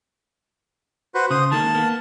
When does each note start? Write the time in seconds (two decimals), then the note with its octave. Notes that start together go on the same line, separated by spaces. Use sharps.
1.15 F#4 B4 C5
1.31 C#3 C5 D#6
1.51 D#3 G#3 A#3 A5
1.75 A#3 B3